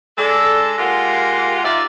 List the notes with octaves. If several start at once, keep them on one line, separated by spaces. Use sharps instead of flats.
G#3 D4 A4
G#3 A#3 F4 G4 F#5
D#4 F4 D5 E5